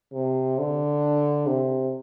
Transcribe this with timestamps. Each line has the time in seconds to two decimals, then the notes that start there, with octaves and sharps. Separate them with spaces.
0.13 C3
0.58 D3
1.47 C3